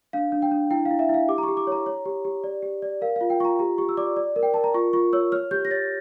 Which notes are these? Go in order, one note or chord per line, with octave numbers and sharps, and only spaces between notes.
D4 F5
D4
G5
D4
E4 G5
F5
E4
E5
E4 F5
G4 D6
A#5
C#6
G4
D6
C#5 A#5
C#5
G4
G4
D5
G4
D5
A#4 F5
F5
F4
G5
F4 A#5 C#6
G4 A#5
G4 C#6
E6
D5 D6
D5
A#4
G5
A#4 A5
A#5
F4 C#6
F4 C#6
C#5 E6
C#5 F6
G4 G6
A#6
C#5 A6